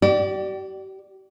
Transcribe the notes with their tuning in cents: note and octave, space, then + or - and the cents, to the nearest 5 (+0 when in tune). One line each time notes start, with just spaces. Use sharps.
G4 -40 D5 +15